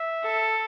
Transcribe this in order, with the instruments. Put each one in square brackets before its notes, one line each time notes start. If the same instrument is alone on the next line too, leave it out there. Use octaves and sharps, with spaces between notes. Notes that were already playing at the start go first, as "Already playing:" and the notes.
Already playing: [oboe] E5
[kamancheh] A4